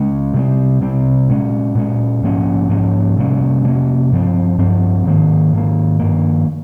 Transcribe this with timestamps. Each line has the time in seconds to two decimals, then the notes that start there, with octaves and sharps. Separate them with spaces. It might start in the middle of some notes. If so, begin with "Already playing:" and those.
Already playing: C#3 G#3 C#4
0.34 C3 G3 C4
0.81 C3 G3 C4
1.28 A#2 G#3 C#4
1.75 A#2 G#3 C#4
2.23 G#2 F3 A#3 C#4
2.69 G#2 F3 A#3 C#4
3.17 C3 G3 A#3 C#4
3.64 C3 G3 A#3 C#4
4.12 G2 F3 C4
4.58 G2 F3 C4
5.05 G#2 D#3 A#3
5.53 G#2 D#3 A#3
6.00 G2 D#3 A#3